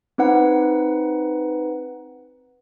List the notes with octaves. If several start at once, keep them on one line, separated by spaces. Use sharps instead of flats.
C4 D#4 B4 F#5